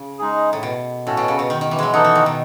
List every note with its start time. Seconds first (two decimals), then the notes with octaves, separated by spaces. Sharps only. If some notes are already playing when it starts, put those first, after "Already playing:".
Already playing: C#3
0.19 G#3 D#4 G#4
0.53 A2
0.63 B2
1.06 A2 C#4 F#4 A4
1.17 B2
1.28 C#3
1.39 B2
1.50 D#3
1.61 D#3
1.71 E3
1.79 F#3 G#3
1.93 E3 D#4 A4 D#5 F#5
2.05 E3
2.15 D#3
2.26 B2